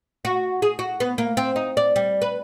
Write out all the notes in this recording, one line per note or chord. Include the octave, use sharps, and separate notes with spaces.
F#4
G#4
F#4
B3
A#3
C4
D#4
D5
G3
B4